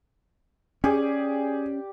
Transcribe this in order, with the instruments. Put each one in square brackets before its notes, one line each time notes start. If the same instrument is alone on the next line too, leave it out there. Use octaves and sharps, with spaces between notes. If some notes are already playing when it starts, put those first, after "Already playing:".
[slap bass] C#4 [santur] G4 D5 [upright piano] G#4